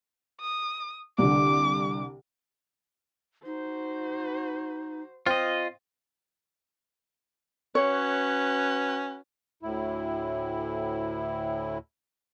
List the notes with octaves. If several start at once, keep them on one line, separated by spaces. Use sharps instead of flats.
D#6
C2 D3 D6
D#4 F#4 C5
C4 F4 D#5
C#4 F#4 B4 C#5
D2 A2 E4